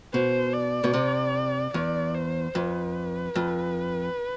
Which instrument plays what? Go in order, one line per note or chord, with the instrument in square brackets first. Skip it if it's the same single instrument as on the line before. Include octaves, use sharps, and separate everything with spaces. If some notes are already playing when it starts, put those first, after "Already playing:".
[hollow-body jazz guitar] B2 [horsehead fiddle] C5
[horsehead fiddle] D5
[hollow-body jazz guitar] B2
C3
[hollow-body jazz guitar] E2 [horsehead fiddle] D5
[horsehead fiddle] C5
[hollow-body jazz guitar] F2 [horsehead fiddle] B4
[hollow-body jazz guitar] F2